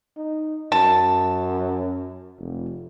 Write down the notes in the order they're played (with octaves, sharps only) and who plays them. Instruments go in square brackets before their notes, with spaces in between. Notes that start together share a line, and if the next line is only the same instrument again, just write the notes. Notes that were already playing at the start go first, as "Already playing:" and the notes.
[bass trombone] D#4
[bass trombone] F#2 [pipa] A5
[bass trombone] F1